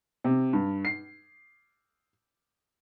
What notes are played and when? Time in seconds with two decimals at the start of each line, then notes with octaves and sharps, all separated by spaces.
0.24 C3
0.53 G2
0.85 C7